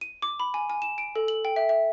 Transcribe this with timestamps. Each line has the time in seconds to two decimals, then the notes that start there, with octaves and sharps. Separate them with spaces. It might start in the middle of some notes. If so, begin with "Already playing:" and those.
0.01 D#7
0.22 D6
0.40 B5
0.54 G#5
0.70 G#5
0.82 E7
0.98 D7
1.16 A4
1.28 F#7
1.45 G5
1.56 E5
1.69 E5